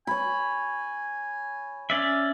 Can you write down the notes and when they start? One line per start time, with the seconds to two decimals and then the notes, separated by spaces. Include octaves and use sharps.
0.07 C#5 G#5 B5
1.90 C#4 D5 E5